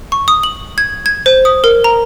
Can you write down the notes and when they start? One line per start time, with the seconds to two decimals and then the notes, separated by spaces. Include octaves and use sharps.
0.12 C#6
0.28 D#6
0.43 F#7
0.78 G#6
1.06 G#6
1.26 C5
1.45 D#6
1.64 A#4
1.84 A#5